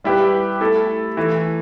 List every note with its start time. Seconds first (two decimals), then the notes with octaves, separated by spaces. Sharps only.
0.04 G3 E4 G4 B4
0.61 A3 E4 A4
1.17 E3 A3 E4